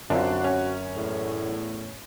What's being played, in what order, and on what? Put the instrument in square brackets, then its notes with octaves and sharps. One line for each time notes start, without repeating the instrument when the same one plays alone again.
[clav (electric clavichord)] F#2 [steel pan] D3 C4 F4 [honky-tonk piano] D4 [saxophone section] F#4
[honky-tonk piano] C#4
[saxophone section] E2 A2